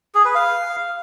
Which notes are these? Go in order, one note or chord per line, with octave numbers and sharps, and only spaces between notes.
G#4
B4
F5